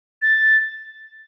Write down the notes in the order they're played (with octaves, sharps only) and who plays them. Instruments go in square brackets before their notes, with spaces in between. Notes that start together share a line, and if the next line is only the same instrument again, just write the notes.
[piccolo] A6